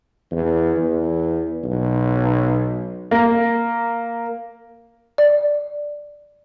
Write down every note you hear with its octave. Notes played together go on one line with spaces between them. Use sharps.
E2
E2
B1
A#3
D5